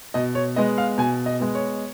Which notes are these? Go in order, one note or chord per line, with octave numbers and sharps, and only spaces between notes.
B2 D#5
C#5
G#3 B3 D#5
F5
B2 G#5
D#5
G#3 B3
C#5